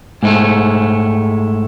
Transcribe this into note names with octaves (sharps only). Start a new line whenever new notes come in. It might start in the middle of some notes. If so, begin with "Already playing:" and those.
G#2 G#3 A3